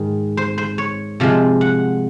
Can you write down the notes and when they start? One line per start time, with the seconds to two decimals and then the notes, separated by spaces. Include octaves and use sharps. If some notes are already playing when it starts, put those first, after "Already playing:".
Already playing: G#2 D#3
0.37 C5
0.58 C5
0.78 C#5
1.20 C3 F3 G#3
1.61 F#5